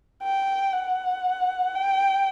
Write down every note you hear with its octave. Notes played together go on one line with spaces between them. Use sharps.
G5
F#5
G5